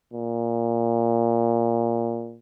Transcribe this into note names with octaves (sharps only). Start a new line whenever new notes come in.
A#2